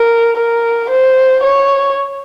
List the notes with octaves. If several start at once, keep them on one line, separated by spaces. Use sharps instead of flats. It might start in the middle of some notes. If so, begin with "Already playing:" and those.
Already playing: A#4
A#4
C5
C#5